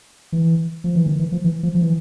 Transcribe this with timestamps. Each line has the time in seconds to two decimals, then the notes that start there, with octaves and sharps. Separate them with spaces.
0.32 E3
0.84 F3
0.95 E3
1.07 D#3
1.19 E3
1.32 F3
1.44 E3
1.63 F3
1.75 F3
1.82 E3